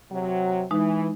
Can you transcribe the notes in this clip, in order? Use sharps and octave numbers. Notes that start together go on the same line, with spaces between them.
C3 F#3
E3 G#3 D#4